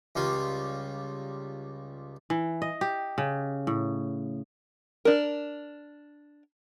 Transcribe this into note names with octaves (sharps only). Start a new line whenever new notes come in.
C#2 G3 F4
E3
D#5
G4
C#3
A2
D4 A#4